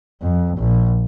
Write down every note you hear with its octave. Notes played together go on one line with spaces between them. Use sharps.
F2
A#1